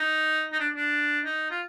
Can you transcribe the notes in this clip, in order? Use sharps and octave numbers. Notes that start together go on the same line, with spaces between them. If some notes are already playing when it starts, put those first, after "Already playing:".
Already playing: D#4
D#4
D4
D4
D#4
F4